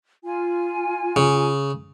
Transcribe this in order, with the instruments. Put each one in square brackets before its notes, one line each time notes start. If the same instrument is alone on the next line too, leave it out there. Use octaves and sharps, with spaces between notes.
[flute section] F4 G#5
[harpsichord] C#3